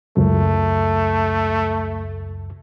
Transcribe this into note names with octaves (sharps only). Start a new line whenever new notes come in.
C#2 F#2 A3